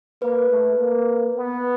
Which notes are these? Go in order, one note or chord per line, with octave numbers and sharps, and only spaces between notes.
A#3 B4
A3
A#3
B3